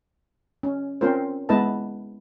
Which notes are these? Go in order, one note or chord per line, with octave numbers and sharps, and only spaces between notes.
C#4
C4 C#4 F4 A#4 C5
G#3 B3 E4 B4 D#5 A5